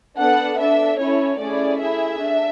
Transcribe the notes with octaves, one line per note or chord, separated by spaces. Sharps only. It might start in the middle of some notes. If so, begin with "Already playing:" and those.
B3 D4 A4 F#5
D4 A4 E5
C#4 E4 A4 C#5
A3 C#4 E4 G#4 D5
A3 E4 G#4 E5
D4